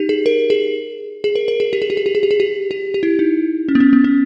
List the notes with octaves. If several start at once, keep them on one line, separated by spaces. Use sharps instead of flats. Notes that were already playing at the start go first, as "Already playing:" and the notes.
Already playing: D#4 G4
G#4
A#4
G#4
G#4
A#4
A#4
G#4
G4
G#4
G4
G#4
G4
G#4
G4
G#4
G4
G4
G4
E4
D#4
C#4
B3
C#4
B3
C#4